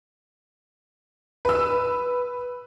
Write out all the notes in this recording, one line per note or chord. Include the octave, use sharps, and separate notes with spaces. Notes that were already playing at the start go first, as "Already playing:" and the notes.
B4 E6